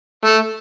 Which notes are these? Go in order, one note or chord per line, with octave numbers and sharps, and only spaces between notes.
A3